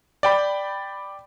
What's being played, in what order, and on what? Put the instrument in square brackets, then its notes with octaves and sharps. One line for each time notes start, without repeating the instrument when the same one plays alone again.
[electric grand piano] D5 G5 B5